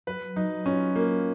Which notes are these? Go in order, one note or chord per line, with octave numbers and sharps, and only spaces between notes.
F#3 B4
F#3 D#4
C#4 F4
A#3 F4